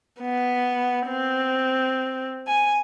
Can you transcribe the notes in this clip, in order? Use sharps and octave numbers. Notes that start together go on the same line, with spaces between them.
B3
C4
G#5